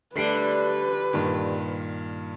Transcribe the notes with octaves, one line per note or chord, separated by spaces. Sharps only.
D3 G3 A3 B4 C7 D7
G2 A#2 D#3